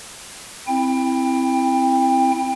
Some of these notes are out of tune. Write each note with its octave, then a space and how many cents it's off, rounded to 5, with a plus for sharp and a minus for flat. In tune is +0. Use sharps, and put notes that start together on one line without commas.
C4 +0 E4 +0 G5 +25